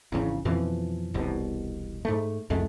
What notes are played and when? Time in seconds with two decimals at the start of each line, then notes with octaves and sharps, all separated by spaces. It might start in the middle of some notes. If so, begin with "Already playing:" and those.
0.12 G#1 E2 C#3
0.45 F2 B2 E3 F3
1.14 E1 C2 B2
2.05 G#2 A3
2.50 C2 F2 G#3 A3